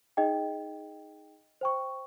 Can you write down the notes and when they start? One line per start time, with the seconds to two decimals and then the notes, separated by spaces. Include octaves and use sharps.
0.17 D#4 G#4 D#5 G5
1.61 C5 G5 C#6